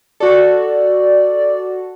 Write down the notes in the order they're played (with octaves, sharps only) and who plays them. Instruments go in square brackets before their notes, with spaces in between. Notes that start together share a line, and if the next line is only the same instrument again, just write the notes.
[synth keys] F#4 A4 [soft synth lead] D5